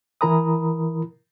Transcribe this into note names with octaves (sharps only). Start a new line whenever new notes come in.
E3 E4 A#4 A#5 B5 D#6